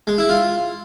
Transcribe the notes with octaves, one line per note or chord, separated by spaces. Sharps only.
G#3
E4
F4